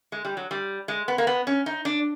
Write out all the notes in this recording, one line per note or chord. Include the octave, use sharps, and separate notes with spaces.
G#3
G3
F#3
G3
G#3
B3
A#3
B3
C#4
D#4
D4